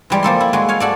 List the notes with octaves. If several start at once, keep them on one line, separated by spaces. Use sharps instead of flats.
E3 G3 G#3
F3 A#3 A4 C6
E4
G#3 F#4
C#5 F5 G#5
F#4 A4 D5